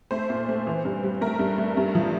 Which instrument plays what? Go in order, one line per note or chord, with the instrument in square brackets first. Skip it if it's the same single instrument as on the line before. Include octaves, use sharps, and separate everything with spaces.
[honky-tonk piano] A3 C5
A#2
A3
E3
G2
G3
A3 A#4
G2
A3
G2
F3